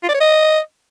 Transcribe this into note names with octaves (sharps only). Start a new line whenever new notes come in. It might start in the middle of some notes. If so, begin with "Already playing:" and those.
F4
D5
C#5
D#5